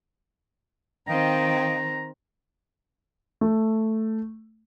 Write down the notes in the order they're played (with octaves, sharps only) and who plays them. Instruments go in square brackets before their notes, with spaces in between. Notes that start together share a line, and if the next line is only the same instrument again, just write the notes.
[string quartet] D#3 C4 [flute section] D#5 F5 G5 [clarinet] A#5
[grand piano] A3